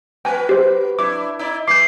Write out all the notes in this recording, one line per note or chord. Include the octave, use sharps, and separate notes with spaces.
A#3 F#4 B4 G5 G#5
G4 C5
D4 E4 D6
D#4 E4 D5
E3 D6 G6 C7